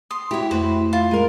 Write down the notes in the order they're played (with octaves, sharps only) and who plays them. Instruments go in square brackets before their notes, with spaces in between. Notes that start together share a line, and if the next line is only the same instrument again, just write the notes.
[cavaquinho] C6 [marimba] D#6
[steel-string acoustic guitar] E4 F#4 [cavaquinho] G4 C#5
[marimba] F2 A3 [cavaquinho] B4 C5
[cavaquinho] F4
[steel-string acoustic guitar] G#3 A#4